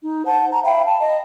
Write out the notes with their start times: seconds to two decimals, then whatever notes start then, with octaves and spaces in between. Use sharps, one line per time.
0.01 D#4
0.26 C5 F#5 A5 G6
0.51 A#5
0.64 E5 F5 G5 B5
0.86 A5
1.01 D#5